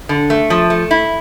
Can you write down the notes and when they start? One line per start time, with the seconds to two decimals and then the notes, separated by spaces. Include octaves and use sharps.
0.09 D3
0.30 A3
0.50 F3
0.70 A3
0.91 E4